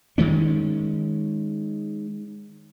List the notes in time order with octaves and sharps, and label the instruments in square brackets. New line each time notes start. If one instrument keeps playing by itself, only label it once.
[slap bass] D#3 G#3 C#4